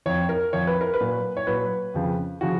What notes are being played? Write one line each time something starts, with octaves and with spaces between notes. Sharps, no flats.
F2 F3 C#5
A#4
F2 F3 C#5
B4
A#4
B4
A#2 F#3
C#5
A#2 F#3 B4
F2 C#3 F3
C#3 F3 F#4